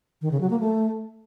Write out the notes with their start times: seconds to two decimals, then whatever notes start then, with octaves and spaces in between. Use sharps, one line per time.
0.22 D#3
0.31 C#3
0.41 F#3
0.50 A#3
0.60 A3